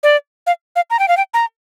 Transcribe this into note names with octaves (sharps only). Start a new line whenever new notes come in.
D5
F5
F5
A#5
G5
F5
G5
A#5